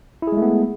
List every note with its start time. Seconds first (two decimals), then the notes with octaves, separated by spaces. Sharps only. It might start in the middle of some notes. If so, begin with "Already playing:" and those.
0.22 E4
0.27 G#4
0.32 G#3
0.37 A3
0.42 B3